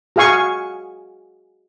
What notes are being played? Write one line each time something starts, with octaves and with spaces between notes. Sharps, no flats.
F#4 G#4 F5 G#5 C#6